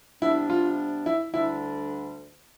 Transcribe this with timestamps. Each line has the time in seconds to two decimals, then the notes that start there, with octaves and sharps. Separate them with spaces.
0.22 C3 G3 B3 D4 E4
0.50 F4
1.06 E4
1.34 D2 D3 G3 D4 E4